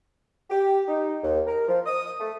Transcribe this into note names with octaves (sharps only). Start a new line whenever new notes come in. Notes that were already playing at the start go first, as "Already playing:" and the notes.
G4
D#4
D#2
A#4
F3
D#6
A3